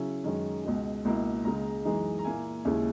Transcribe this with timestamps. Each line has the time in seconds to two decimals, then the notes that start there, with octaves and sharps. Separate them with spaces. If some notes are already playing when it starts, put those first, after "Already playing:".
Already playing: C#3 F#3 C#4 E4
0.24 F#2 D#3 G#3 C#4
0.65 C#2 B2 G#3
1.05 C#2 B2 A#3 E4
1.45 C#2 C#3 G#3 A#5
1.85 F#2 E3 G#3 D#4
2.19 A#5
2.24 A#2 A#3 E4 G#5
2.65 D#2 C#3 G#3 C#4 E4